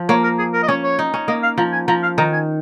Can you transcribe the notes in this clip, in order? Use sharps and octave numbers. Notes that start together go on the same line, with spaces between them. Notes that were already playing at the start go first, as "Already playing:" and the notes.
Already playing: F3
A#3 C#5
A#4
G#4
A#4
D#5
C#4 C#5
C#5
D#4
C#4
A#3 D#5
F5
F3 A#5
G#5
F3 A#5
F5
D#3 A#5
G#5